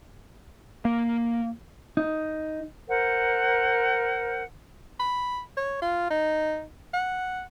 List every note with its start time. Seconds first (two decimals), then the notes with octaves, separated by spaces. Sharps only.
0.85 A#3
1.97 D#4
2.88 A#4 C5 F#5
4.99 B5
5.57 C#5
5.82 F4
6.10 D#4
6.93 F#5